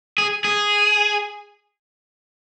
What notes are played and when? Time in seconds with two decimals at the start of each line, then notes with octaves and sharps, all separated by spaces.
0.18 G#4
0.45 G#4